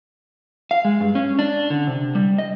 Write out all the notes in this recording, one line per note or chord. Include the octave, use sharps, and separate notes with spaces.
F5
G#3
G2
C#4
D4
D3
C3
G3
D#5